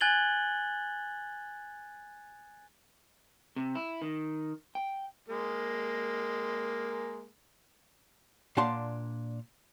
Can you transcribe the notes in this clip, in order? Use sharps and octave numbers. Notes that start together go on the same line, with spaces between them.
G#5 F#6 G#6 A6 F#7 G7
C3
E4
D#3
G5
G#3 A#3
A#2 D4 F5 F#5 A5 C6